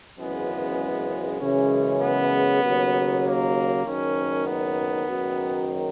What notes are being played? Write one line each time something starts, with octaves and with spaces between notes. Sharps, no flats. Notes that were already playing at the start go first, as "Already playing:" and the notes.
G#1 F#2 C#3 E3 G#3 B3
F#2 C#3 E3 G#3 C#4
B3
D#2 C#3 F#3
A#3
F#1 F#2 D#3 C#4
B3
F#1 F#2 D#3 F#3